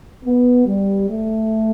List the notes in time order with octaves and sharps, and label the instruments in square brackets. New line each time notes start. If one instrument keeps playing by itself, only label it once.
[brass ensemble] B3
G3
A3